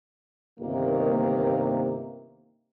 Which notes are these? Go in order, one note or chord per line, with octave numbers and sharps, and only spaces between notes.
G1 C3 D#3 A#3